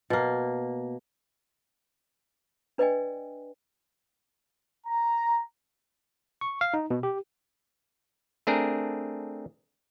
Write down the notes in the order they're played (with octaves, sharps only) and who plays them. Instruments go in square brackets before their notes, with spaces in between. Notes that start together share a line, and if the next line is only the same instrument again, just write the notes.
[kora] B2 A#3
[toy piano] D4 B4 D5 D#5 G5 G#5
[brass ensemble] A#5
[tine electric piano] C#6
F5
D#4
B2
G4
[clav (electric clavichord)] A3 C4 D4 G#4 A#4